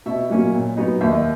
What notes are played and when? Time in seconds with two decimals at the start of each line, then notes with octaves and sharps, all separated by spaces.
0.06 B2 E5
0.30 F#3 A#3 C#4
0.53 A#2
0.77 F#3 B3 D#4
1.01 D#2 E5
1.12 D#5